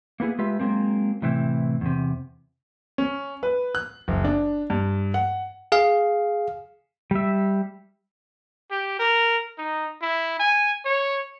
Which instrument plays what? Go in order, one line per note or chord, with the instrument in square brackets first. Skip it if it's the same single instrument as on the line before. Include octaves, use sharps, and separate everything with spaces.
[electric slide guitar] A#3 B3 E4 G#4
G#3 F4 G4 B4 E5
F#3 G#3 A#3 C4
A2 C3 E3 C4 E4
E2 C3
[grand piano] C#4
B4
F#6
F#1
D4
G2
F#5
[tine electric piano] G#4 F5
[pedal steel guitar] G3 E5
[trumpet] G4
A#4
D#4
E4
G#5
C#5